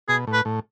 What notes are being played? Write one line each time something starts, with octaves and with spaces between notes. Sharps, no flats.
B2 G#4
A2
B4
A2